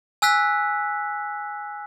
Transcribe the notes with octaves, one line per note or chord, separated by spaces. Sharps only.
G#5 E6 F#6 B6